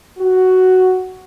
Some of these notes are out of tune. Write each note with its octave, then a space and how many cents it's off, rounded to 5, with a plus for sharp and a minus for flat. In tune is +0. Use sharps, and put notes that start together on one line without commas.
F#4 +5